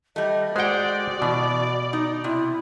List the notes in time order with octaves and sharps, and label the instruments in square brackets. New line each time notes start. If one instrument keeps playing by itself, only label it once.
[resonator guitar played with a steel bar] G3 A3 [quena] D#5
[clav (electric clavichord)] G#3 G5 [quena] F#4 [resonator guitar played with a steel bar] C5 F#5 [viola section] D5
[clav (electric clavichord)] B2 [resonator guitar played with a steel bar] E3
[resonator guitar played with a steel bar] D#4
[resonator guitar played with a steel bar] C3 [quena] E4